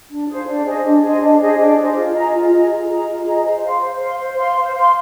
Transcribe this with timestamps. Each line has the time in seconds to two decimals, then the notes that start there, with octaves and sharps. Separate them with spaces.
0.10 D4
0.28 G#4 C5 F5
0.46 D4
0.65 G#4 C5 D#5
0.84 D4
1.02 G#4 C5 D#5
1.21 D4
1.39 G#4 C5 D#5
1.58 D4
1.77 G#4 C5 D#5
1.95 F4
2.14 G#4 D#5 A#5
2.33 F4
2.52 G#4 D#5 A#5
2.70 F4
2.89 G#4 D#5 A#5
3.07 F4
3.26 G#4 D#5 A#5
3.45 C5
3.63 F5 C6
3.82 C5
4.01 F5 C6
4.19 C5
4.38 F5 C6
4.57 C5
4.75 F5 C6